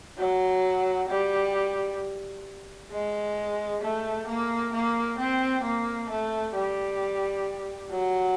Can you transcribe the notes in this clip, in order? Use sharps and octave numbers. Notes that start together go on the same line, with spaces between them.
F#3
G3
G#3
A3
A#3
A#3
C4
A#3
A3
G3
F#3